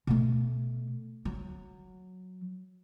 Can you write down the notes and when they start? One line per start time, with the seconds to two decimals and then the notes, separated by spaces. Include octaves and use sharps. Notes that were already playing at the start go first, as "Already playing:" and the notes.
0.07 B2 A3
1.25 F#3